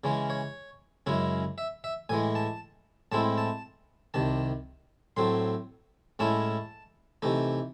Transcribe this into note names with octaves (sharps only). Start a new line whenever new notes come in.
C#3 E3 G#3 C#4
C#5
F#2 C#3 G#3 C#4 E4
E5
E5
A2 E3 G#3 G#5
A5
A2 G#3 C4 E4 A5
A5
C2 C3 D#3 A5
A2 F#3 A3 C4 C6
A2 G#3 C#4 E4 A5
C3 E3 A3 D#4